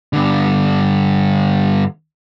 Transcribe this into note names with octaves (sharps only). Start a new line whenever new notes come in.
G2 D3